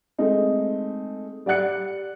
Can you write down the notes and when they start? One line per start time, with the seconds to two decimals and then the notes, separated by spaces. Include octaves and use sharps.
0.19 G#3 A3 C4 D#4
1.46 G3 D5 F#5 F#6 C#7